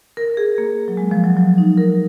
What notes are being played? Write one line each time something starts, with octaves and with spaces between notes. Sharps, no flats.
A#4
G#4
A#3
F#3
G#3
F3
F#3
F#3
D#4
A#4